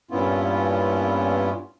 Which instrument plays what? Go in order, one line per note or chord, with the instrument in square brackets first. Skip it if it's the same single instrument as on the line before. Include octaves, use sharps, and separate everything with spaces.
[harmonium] G2 A#2 B3 C#4 E4 F4